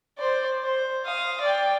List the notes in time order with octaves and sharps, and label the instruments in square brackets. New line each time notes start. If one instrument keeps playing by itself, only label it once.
[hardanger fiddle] C5 D5
C5
F5 D#6
D5 G5